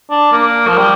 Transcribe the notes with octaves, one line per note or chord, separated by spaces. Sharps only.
D4
A#3
F3
G3